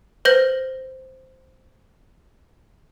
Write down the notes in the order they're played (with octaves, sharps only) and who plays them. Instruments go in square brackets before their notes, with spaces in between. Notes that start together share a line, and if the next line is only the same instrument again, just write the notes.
[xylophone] B4 C5 G6 A#6